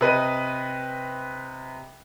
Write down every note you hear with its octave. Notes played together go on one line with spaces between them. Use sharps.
C3 B4 D#5 D#7